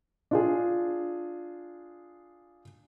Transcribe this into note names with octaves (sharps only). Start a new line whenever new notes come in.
D4 F4 G#4